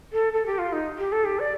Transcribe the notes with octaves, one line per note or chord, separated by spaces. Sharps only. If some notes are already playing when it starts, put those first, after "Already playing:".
A4
A4
G4
F4
D#4
G4
A4
G4
D5